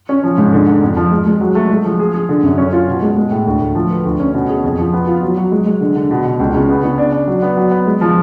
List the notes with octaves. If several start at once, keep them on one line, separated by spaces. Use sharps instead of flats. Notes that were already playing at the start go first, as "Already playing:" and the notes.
C#4
F3
G#2
D3
D3
F2
F3
G#3
G#3
F#3
A3
G#3
F3
G#4
G#4
D3
F#2
C#4
F4
B2
G#3
G#3
A2
D2
D2
F3
B4
D2
C#4
B2
G#4
F2
F3
B3
F4
F#3
F#3
G#3
G#3
D3
D3
B2
B2
C#2
C#3
B3
C#3
D4
D4
F#3
B3
F#3
B3
G#3
F3